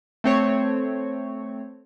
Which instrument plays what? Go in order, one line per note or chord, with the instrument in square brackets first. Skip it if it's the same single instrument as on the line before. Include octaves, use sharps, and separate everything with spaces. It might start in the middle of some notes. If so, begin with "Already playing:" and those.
[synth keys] A3 C4 C#5